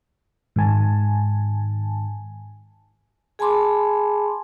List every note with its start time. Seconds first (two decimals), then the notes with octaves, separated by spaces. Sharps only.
0.56 G#2 D#3 G#5 A5
3.39 G#4 G#5 A5 B5 C6 D6